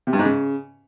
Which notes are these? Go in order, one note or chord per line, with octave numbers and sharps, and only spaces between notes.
C3
G2
G#2
C#3